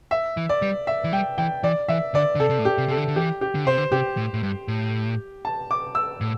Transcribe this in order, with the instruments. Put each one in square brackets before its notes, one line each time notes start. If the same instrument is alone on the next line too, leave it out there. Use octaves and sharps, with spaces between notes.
[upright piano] E5
[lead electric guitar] E3
[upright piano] D5
[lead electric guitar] G3
[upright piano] E5
[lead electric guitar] E3
[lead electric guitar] G3 [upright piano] G5
[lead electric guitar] E3 [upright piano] G5
[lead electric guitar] E3 [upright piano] D5
[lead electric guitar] E3 [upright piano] E5
[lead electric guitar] D3 [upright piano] D5
[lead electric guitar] D3
[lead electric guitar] C3 [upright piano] A4
[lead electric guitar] C3
A2
[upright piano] G4
[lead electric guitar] C3
[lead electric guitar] C3 [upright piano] A4
[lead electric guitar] D3
D3
[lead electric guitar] E3 [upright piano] G4
[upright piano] G4
[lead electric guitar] D3
[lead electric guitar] C3 [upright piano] C5
[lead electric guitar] D3
[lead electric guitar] C3 [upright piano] G4
[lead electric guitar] A2
A2
G2
A2
[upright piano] A5
D6
E6
[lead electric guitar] A2